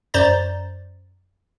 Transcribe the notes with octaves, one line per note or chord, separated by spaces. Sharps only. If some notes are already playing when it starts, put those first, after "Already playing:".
F#2 C5 D5 A#5 A6